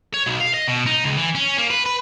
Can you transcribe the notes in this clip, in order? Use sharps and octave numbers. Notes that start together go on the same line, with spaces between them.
C#5
B1
F5
D#5
B2
D#4
C#2
E3
C#4
A#3
B4
B4